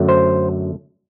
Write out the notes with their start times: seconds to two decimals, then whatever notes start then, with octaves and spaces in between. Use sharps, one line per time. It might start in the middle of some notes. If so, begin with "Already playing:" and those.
Already playing: F#2 D3 F#3 A3
0.08 C5